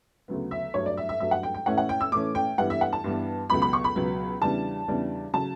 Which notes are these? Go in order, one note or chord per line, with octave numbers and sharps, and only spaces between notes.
D2 C#3 F#3 B3
E5
G2 F#3 A3 C#5
D5
E5
E5
G2 F#3 A3 E5
F#5
G5
G5
A2 E3 A3 C#4 F#5
F#5
G5
E6
A2 E3 A3 C#4 D6
G5
G2 E3 G3 B3 F#5
E5
F#5
A5
G2 E3 G3 B3
C#2 B2 F#3 B3 B5
B5
C#6
B5
C#2 B2 F#3 B3
E2 C#3 E3 G3 D4 A5
E2 C#3 E3 G3 D4
C#3 F#3 A5